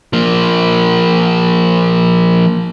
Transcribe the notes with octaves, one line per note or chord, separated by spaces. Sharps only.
F3 A#3